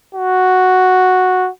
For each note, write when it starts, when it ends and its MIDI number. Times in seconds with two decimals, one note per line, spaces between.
0.15 1.50 66